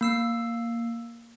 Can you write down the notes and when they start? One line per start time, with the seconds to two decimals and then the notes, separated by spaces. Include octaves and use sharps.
0.01 A#3 E6 C7